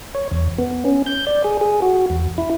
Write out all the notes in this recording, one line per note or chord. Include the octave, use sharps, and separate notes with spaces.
C#5
E2
B3
C#4
G6
D5
G#4
G#4
F#4
E2
E4